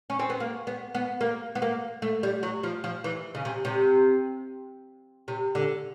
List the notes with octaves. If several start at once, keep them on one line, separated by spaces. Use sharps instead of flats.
C#4
C4
B3
A#3
B3
B3
A#3
B3
A#3
A3
G3
F#3
F3
F3
E3
C#3
C3
C3
C3
D3